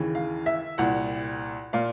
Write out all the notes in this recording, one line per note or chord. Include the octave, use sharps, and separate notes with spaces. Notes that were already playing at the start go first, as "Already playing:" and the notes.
Already playing: D#2 C#3 E3
F5
E5
C2 A#2 F#5
A#2 F5